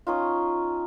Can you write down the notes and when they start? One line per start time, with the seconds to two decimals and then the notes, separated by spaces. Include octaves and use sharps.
0.07 C#4 D#4 F4